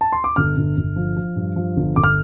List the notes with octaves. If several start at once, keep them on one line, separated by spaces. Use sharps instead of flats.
A5
C6
D6
G1 F6
G1
G1
F3
F3
G2
F3
G1
G1 D6
F6